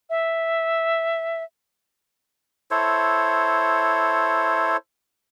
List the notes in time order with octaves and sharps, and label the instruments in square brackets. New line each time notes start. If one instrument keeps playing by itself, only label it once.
[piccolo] E5
[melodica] E4 A4 C5 C#5